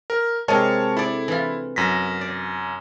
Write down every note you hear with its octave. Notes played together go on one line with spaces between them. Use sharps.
A#4
C3 G#3 A#4 C#5 A5
E4 A4 D5
E3 F4
F#2 A#6 B6
D5